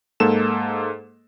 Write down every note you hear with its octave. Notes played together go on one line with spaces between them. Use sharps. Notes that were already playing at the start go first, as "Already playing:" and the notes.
G#2 A#3 A4 E7